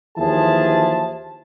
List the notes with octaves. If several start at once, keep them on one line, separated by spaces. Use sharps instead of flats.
D#2 E3 F3 G#4 E5 A5